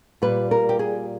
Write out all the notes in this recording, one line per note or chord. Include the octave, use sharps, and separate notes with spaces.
A#2 G3 B4
A#4
G4
G#4